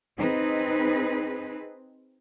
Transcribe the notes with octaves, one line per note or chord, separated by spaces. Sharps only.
C4 D#4 G#4 B4